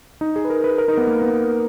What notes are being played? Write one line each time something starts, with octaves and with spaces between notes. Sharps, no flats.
D#4
G#4
B4
A#4
B4
A#4
D#4
B3
A#3
B3